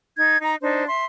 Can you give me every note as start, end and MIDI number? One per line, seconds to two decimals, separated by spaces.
0.17 0.39 63
0.17 0.39 92
0.42 0.56 63
0.42 0.56 82
0.61 0.87 62
0.61 0.87 63
0.61 0.87 72
0.87 1.05 76
0.87 1.05 84